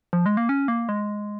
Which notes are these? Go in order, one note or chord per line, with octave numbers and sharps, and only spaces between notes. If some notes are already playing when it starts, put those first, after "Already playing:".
F3
G#3
A#3
C#4
A#3
G#3